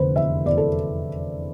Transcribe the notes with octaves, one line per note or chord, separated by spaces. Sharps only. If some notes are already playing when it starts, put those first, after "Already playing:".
Already playing: F1 D3 B4 C5
E2 E5
E2 D5
A4